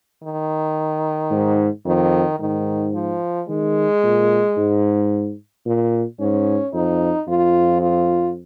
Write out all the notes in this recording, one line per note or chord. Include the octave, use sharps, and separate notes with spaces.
D#3
G#2
F2 D#3
G#2 D#3
F3
D#3 G#3
A#2
G#2
A#2
G#2 C#4
F2 D#4
F2 F4
F4